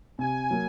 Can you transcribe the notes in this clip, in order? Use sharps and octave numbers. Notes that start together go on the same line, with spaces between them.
C3 G#5
F#3 A#3